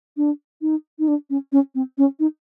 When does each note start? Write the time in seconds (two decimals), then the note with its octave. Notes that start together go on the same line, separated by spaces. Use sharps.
0.17 D4
0.62 D#4
0.99 D#4
1.08 D4
1.30 C#4
1.52 C#4
1.75 C4
1.98 C#4
2.20 D#4